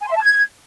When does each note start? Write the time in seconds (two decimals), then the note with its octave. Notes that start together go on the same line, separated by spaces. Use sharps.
0.01 G#5
0.06 C6
0.11 E5
0.17 A5
0.22 G#6